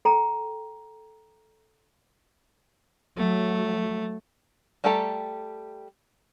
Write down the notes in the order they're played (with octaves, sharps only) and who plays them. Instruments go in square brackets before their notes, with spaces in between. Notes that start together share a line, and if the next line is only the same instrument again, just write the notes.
[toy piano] A4 G5 A#5
[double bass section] F#3 [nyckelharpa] A3
[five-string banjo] G3 A3 G4 A4 A#5